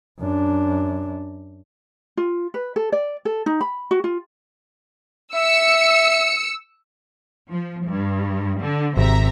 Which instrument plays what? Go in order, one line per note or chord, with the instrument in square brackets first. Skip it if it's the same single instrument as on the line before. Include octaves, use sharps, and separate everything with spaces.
[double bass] F#2 D4
[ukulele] F4
B4
A4
D5
A4
D#4
B5
F#4
F4
[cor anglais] E5 [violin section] E6 C#7
[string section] F3
G2
D3
[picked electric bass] G#1 [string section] C3 E5 A#5